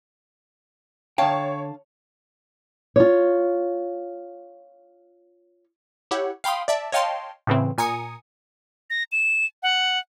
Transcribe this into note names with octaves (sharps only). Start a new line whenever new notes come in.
D3 C#5 F5 G5 A5
F4 C#5
E4 G4 C#5 F#5
F5 G5 B5 C6 D#6
D5 E5 A5
C#5 D#5 F5 G5 A5 C6
A2 C#3 E3 C4
A#2 G#5 A#5 D#6 C#7
A#6
E7
F#5